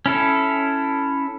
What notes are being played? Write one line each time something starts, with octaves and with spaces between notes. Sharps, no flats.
C#4 E4 A4